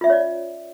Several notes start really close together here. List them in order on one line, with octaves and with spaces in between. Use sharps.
F4 E5 C#4 C#5 D5